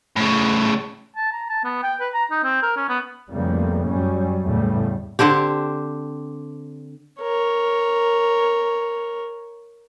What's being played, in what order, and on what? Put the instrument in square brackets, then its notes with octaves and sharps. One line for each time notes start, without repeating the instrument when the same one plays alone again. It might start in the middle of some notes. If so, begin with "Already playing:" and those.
[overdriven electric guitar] A2 C#3
[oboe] A5
A#5
A5
B3
G5
B4
A#5
D#4
C4
A#4
C#4
B3
[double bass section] F2 A2 C#3 G3 A#3 B3
F#2 F#3 G3 C#4
E2 A2 C#3 G3 A3
[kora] D3 C4 D4 G4
[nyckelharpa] A#4 C#5